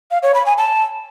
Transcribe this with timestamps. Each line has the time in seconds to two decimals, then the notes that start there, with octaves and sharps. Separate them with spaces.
0.11 F5
0.23 C#5
0.34 B5
0.46 G#5
0.58 A5